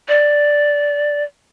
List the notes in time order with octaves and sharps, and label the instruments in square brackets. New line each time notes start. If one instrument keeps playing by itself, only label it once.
[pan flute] D5